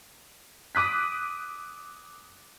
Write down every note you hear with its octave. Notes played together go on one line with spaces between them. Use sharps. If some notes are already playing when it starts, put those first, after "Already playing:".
D6 D#6 F#6 B6